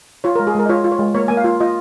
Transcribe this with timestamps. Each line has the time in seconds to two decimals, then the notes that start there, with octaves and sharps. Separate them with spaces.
0.24 F4 C#5
0.36 A#4
0.40 G#3
0.47 G#4
0.55 G#3 A#4
0.66 D#5
0.69 F4 C#5
0.84 F4
0.92 C#5
0.99 G#3
1.15 A#3 C#5
1.28 A#3 G#5
1.37 F5
1.44 F4
1.60 F4 D#5